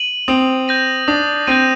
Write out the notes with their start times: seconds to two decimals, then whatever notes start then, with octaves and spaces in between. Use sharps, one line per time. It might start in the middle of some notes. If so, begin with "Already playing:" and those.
Already playing: D#7 F#7
0.28 C4 D#6
0.68 G6 A#6 D#7
1.08 D4 D#6
1.47 C4 G6 A#6 D#7